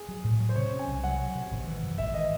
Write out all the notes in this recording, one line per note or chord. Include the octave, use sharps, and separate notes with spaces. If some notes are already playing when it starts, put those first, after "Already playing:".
Already playing: G#4
F#3
A2
F#3
C5
C3 C#5
C#4
G#5
C2
F#3 F#5
F#3
C3
G#1
E3
F#2
G#1 E5
E3 D#5